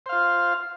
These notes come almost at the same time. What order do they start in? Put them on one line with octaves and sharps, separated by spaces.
C5 F5 F4